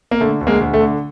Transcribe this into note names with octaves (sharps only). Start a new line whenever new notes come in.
A#3
D3 A3
D2
G#3 A#3
D2
A3
D3